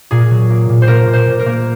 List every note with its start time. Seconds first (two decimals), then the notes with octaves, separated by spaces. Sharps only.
0.11 A#2 G#4
0.31 F#3
0.50 A#3
0.69 A#2
0.82 C5
0.88 A#3 A#4
1.07 A#2
1.13 C5
1.27 A#2
1.39 A#4
1.46 A#3